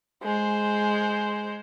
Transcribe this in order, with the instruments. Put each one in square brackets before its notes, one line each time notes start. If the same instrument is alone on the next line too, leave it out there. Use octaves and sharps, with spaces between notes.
[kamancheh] G#3 C5